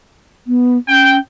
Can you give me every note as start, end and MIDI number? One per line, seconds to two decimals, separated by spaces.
0.47 0.77 59
0.88 1.19 61
0.88 1.14 79